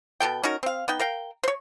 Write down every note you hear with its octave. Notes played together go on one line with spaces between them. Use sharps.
B2 C4 A4 G5
C#4 D#4 F#4 A#4
C4 F5
B3 D#4 G5
A#4 F5 G5
C5 C#5